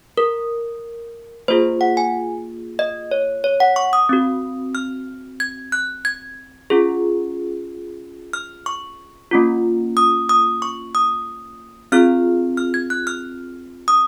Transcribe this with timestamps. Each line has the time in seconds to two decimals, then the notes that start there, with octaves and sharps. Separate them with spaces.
0.17 A#4
1.48 A#3 F4 G#4 C5
1.81 F#5
1.97 G#5
2.79 D#5
3.11 C#5
3.44 C#5
3.60 F#5
3.76 C#6
3.93 D#6
4.09 C4 F#4
4.75 F6
5.40 G#6
5.72 F#6
6.05 G#6
6.70 C#4 F4 G#4
8.33 F6
8.66 C#6
9.31 A#3 C#4 F4
9.97 D#6
10.29 D#6
10.62 C#6
10.95 D#6
11.92 C4 F4 G#4 F6
12.57 F6
12.74 G#6
12.90 F#6
13.07 F6
13.88 D#6